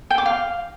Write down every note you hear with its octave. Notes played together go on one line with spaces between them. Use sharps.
G5
D6
F5